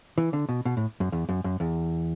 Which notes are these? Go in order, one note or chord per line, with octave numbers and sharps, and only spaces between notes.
E3
D3
B2
B2
A2
F#2
E2
F#2
F#2
E2